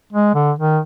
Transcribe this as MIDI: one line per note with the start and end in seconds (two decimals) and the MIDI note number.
0.13 0.32 56
0.35 0.51 50
0.59 0.79 51